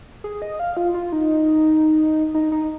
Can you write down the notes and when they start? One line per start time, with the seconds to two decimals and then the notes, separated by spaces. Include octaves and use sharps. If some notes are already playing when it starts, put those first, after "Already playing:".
0.24 G#4
0.42 D#5
0.60 F5
0.77 F4
0.94 F4
1.13 D#4
2.34 D#4
2.52 D#4